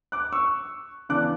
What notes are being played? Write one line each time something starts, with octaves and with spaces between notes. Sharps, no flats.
D6 F#6
C#6 E6
C#3 E3 B3 D4 D6 F#6